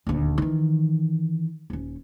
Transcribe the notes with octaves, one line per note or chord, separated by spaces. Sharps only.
D#1 D2
D#3 E3
D#1 C#4